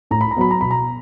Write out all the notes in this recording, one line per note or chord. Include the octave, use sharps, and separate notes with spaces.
A2 A#5
B5
A#5
F#3 B3 B5
A#5
B2 B5
A#5